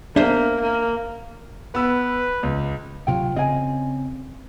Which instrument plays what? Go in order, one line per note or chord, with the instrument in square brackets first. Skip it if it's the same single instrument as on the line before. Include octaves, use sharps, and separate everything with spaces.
[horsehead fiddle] A#3 [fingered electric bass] B3 D4 [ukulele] C5 E5
[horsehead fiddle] A#3
[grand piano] B3 E6 [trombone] B4
[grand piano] C#2
[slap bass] D2 C3 F#3 [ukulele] F4 G5
[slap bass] C#3 C4 [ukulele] D#5 G#5